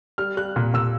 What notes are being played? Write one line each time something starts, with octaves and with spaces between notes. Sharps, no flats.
G3 F6
G3 F#6
A#2
A#2 E6